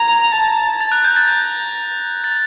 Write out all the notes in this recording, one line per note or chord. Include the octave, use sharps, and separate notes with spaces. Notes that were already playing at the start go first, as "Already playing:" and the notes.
Already playing: A#5 G#6
A5
A#5 A6
F#6
G6
A6
G6
A6